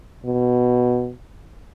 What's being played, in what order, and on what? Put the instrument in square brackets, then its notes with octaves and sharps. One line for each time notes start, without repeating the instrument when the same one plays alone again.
[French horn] B2